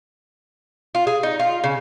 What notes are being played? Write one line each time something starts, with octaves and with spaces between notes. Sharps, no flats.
F4
G#4
D#4
F4
C#3